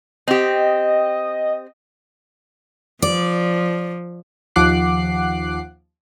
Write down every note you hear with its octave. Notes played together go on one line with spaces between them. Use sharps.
C4 G4 D#5
F3 D5
D#2 F3 F#5 D6 F#6 C7